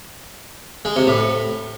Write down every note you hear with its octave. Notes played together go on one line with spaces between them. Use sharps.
G#3
C3
A2